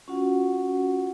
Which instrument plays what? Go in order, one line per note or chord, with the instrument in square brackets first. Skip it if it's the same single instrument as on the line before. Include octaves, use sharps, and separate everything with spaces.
[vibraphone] C#4 F4 F#4 F#5